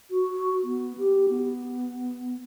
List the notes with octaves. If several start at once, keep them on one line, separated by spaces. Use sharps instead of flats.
F#4
B3
G4
B3